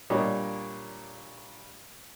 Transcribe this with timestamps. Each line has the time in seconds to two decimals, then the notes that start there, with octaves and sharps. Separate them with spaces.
0.10 A#2 G3 A#3 D4 C#5 D#5